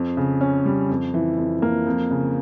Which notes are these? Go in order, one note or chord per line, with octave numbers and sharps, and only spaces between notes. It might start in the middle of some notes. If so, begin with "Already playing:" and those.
Already playing: F2
C#3
C#4
G3
F2
E3
F2
A#3
F2
C#3